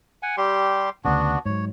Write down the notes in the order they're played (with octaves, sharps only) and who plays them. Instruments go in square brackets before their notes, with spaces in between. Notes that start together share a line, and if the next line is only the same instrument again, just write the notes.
[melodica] F#5 G#5
G3 G4 C6
[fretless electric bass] D2 C#3 [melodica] B3 D4 F#4
[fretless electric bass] G#2 F#3 [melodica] C#5